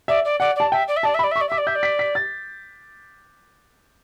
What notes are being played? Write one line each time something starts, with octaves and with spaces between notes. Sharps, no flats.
D5 E5
D5
D5 F#5
D5 A5
E5 G5
D5
E5
D5 A5
E5
B5
D5
E5
C#6
D5
E5 D6
D5
E5 G6
D5
B6
B6
A6